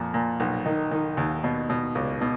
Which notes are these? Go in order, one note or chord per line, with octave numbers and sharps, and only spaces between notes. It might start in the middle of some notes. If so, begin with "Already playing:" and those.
Already playing: F2 A#2
A#2
B1
D#3
D#3
D#2
B2
B2
C#2
B2